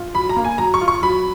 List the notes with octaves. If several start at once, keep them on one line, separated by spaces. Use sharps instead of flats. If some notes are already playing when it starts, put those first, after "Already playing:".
Already playing: F4
F#3 B5
A#5
A#3
G#5
F#3 A#5
C#6
F4
C#6
F#3 B5